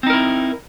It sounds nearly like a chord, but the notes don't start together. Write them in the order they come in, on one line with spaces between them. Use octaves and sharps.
C4 D#4 A#4 E4